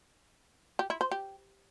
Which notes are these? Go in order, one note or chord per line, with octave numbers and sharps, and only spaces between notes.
G4
E4
C5
G4